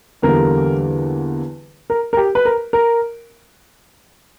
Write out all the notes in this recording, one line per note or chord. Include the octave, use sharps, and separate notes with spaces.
E2 D3 G3 A#3 A#4
A#4
A#4
G4
B4
A#4
A#4